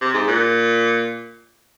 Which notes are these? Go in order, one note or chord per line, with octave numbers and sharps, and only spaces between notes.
C3
G#2
A#2